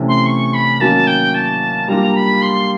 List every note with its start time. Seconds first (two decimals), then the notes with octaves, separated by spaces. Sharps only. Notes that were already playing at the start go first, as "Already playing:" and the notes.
Already playing: C3 E3 A3 C#4
0.08 C6
0.26 C#6
0.54 B5
0.80 D#3 F#3 A#3 C#4 F#4 A5
1.07 G5
1.34 A5
1.88 G3 A#3 D4 F4 A#5
2.15 B5
2.42 C6